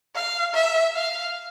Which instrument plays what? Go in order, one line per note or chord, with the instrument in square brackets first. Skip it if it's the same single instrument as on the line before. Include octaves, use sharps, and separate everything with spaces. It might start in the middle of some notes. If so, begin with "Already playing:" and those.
[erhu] F5
E5
F5